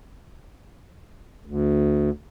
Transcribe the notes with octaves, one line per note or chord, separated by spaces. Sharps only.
D2